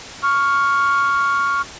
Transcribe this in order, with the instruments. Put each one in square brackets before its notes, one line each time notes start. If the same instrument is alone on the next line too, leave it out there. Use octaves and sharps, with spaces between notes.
[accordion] C#6 F6